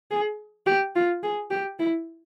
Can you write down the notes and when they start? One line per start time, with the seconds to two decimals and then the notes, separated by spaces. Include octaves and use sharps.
0.11 G#4
0.66 G4
0.95 F4
1.23 G#4
1.51 G4
1.79 E4